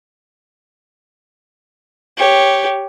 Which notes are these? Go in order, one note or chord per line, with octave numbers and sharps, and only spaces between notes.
G4 C#5